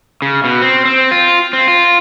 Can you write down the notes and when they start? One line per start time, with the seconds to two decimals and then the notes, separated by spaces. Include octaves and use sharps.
0.22 C#3
0.44 B2
0.61 C4
0.85 C4
1.11 F4
1.53 C4
1.68 F4